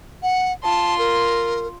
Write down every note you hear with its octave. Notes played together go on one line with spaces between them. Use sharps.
F#5
F4 A5 C6
A#4